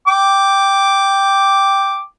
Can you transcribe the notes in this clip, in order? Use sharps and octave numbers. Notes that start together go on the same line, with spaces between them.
G5 D6